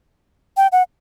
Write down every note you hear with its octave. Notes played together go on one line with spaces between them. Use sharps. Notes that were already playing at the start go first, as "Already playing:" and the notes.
G5
F#5